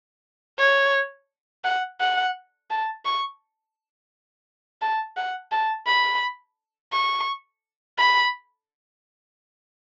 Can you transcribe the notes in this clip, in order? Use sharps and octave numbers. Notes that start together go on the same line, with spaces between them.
C#5
F#5
F#5
A5
C#6
A5
F#5
A5
B5
C#6
B5